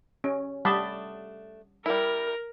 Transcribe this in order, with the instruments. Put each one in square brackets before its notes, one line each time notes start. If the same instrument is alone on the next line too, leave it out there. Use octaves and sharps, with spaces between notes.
[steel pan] C#4 [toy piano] G4
[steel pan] G3 A5 B5 [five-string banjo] A3 D4 [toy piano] F#5 D6 D#6
[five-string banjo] G3 E4 [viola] A#4